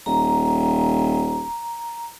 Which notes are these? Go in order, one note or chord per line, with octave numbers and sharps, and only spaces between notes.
D#1 A#5